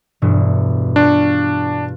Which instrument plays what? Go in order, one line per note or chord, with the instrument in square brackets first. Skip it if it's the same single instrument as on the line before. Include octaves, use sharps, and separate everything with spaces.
[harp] E1 G2 B2
[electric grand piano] D4 [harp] F4 C#6